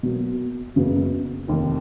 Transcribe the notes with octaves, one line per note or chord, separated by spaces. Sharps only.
B2 F#3 A#3
F#1 F#2 C#3 F#3 B3
F1 D#2 D#3